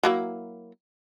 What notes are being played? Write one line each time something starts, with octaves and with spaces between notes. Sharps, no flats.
F#3 A#3 E4